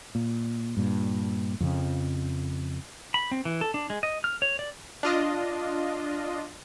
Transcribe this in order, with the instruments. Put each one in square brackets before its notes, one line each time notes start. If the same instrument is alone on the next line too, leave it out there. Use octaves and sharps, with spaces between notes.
[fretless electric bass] A#2
G2 A#2
F2 C#3 F3
[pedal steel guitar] B5
C4
E3
A4
D4
G#3
D#5
F6
C#5
D5
[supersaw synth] D4 F4 D#5